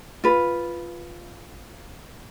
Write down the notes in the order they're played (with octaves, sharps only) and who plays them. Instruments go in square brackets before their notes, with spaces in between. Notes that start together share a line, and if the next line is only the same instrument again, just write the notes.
[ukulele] F4 B4